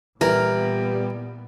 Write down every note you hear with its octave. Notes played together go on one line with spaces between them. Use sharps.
A#2 E3 G3 B3 A#4